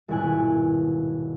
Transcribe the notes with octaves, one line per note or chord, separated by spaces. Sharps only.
D#1 G#2 B2 E4 G#5 F#6